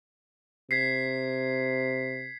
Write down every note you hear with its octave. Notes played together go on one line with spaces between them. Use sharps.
C3 G#6 B6 C7